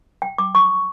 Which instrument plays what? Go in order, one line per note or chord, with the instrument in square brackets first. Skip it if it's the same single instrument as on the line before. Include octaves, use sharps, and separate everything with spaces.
[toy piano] G5
D6
C#6